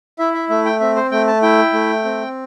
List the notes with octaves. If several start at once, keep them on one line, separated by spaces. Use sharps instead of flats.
E4 E5
E5
A3 E5
G5
C4 E5
C5
A3 G5
A5
E4 G5
A3
C4